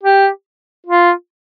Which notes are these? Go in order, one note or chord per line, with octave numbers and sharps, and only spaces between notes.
G4
F4